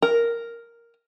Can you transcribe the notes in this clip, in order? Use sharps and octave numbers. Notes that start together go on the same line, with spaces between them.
A#4